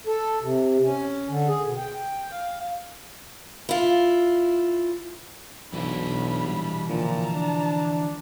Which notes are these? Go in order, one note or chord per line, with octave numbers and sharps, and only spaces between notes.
A4
C3
C#4
D3
G#4
B2
G5
F5
E4 F4
B1 E3 D4 E4 F#4 B5
A#2 G3
A#2 D3 F3 A5 A#5
D4